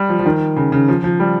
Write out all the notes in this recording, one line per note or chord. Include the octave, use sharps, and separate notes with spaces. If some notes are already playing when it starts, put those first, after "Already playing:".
Already playing: G3
F3
F3
D#3
C#3
C#3
F3
F3
G3